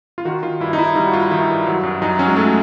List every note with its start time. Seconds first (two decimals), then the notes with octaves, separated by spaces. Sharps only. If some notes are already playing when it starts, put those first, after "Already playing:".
0.18 F4
0.25 D#3 F#4
0.43 D#3 F4
0.60 G2 E4
0.73 D#4
0.78 G2 E4
0.95 G3 D#4
1.05 F#4
1.13 G2 F4
1.31 D#3 E4
1.48 G2
1.67 F#3
1.83 F#2
2.02 F#2 D#4
2.19 F#3 C#4
2.27 G#3
2.36 F#3 A3